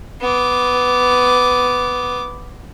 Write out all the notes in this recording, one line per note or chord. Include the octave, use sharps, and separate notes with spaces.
B3 D6